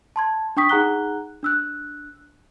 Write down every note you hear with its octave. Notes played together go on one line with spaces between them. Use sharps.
A5 C6 G#6
D4 G5 C#6 D#6 B6
D#4 G#4 F#5 A#5 F#6 G7
D4 E6 F#6